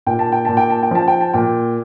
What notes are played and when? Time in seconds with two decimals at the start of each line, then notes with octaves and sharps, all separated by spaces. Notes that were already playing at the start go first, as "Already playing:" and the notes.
0.06 A#2 G5
0.19 A5
0.32 G5
0.45 A#2 A5
0.57 G5
0.70 A5
0.83 G5
0.91 F3 A5
1.08 G5
1.21 A5
1.33 A#2 G5